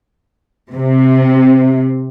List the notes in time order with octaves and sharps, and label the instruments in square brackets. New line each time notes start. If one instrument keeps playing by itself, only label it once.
[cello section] C3